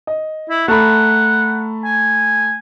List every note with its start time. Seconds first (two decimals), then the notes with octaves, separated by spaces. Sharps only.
0.07 D#5
0.50 E4
0.68 A3 F#5 A#5 B5
1.85 G#5